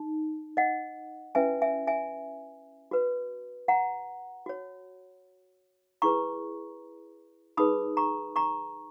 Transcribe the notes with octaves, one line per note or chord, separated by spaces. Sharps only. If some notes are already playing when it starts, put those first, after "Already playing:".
Already playing: D#4
D#5 F#5
C#4 E4 B4 E5 G#5
E5 G#5
E5 G#5
F#4 B4
F#5 A#5
F#4 C#5
E4 G#4 B4 A#5 C#6
D#4 G#4 B4 B5 D#6
A#5 C#6
A#5 C#6